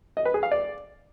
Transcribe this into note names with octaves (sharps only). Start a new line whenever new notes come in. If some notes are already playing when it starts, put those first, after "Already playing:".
D#5
B4
G#4
F5
D5